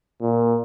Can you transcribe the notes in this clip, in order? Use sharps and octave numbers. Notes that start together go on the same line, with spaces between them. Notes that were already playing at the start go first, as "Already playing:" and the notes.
A#2